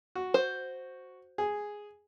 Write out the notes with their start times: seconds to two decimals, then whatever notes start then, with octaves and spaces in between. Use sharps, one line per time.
0.15 F#4
0.34 C5
1.38 G#4